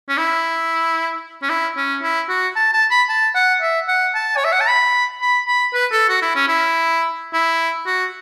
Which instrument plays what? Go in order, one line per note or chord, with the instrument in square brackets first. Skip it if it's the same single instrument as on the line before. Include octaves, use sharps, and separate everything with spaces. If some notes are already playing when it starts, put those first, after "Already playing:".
[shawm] C#4
E4
C#4
E4
C#4
E4
F#4
A5
A5
B5
A5
F#5
E5
F#5
A5
C#5
E5
F#5
A5
B5
B5
B5
B4
A4
F#4
E4
C#4
E4
E4
F#4